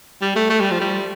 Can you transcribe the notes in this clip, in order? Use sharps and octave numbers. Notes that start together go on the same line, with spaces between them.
G3
A3
A3
G3
F3
G3